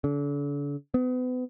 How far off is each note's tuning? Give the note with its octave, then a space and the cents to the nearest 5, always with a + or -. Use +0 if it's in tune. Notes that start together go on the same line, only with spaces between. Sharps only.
D3 -40
B3 +35